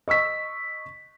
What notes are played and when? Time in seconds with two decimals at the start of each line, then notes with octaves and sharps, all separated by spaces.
0.08 D#5 C#6 E6 B6